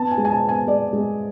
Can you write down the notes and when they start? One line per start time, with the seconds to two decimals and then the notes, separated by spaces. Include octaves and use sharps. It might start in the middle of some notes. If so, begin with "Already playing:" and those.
Already playing: B3 A5
0.12 G#5
0.18 G#3
0.25 G#5
0.30 A5
0.43 B3
0.49 G#5
0.67 G#3 D5
0.93 G#3